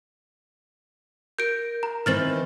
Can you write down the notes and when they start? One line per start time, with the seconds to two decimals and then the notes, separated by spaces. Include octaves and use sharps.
1.39 A#4 G6 D7
1.83 A#5
2.06 D#3 E3 C4 F6 A6 F#7